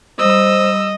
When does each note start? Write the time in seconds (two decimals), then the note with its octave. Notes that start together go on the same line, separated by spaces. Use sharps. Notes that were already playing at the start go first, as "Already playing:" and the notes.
0.19 G3 C5 D#5 E6